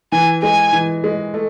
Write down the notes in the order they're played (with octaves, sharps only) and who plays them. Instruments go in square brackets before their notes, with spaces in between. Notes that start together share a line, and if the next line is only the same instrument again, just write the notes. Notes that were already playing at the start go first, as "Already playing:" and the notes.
[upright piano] E3 [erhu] G#5
[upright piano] G#3 [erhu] G#5
[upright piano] E3
G#3
A3